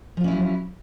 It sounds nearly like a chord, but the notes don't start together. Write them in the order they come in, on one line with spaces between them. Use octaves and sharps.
F3 F4 C#4 E4 F#3